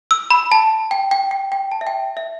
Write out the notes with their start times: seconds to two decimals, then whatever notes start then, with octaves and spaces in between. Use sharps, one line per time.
0.11 E6
0.30 B5
0.52 A5
0.91 G5
1.11 G5
1.31 G5
1.52 G5
1.71 A5
1.81 E5
1.87 G5
2.17 E5